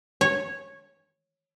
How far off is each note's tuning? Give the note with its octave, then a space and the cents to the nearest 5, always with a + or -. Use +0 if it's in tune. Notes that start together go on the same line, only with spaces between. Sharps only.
C#5 -10